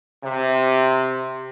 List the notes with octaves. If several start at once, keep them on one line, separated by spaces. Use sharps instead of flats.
C3